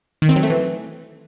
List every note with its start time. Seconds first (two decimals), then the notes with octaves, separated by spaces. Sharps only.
0.22 D#3
0.29 C4
0.36 F#3
0.43 A3
0.50 E3